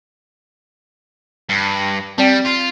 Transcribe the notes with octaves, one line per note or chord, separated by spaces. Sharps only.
G2
G3 C4 D5 G5
F4